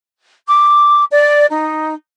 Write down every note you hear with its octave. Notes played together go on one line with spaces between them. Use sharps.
D6
D5
D#4